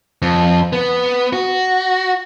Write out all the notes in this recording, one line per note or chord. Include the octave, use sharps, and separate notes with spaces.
F2
B3
F#4